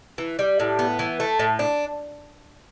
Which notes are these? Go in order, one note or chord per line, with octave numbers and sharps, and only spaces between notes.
E3
G3
A2
B3
E3
A3
A2
D4